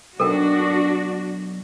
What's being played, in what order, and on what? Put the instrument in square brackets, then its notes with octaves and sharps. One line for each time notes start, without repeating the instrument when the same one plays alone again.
[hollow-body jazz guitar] B1 [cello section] D4 F#4 [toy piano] A4 A#4 G5